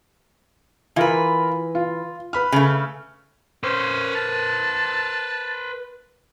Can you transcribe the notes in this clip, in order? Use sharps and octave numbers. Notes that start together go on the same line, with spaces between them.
E3 F4 A#4 B4
F4
B4 B5 F6
C#3 A3
C#4 B4 C5
A5